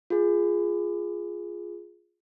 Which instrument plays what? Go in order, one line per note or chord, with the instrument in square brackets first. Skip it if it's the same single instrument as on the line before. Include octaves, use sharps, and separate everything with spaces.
[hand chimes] F4 G#4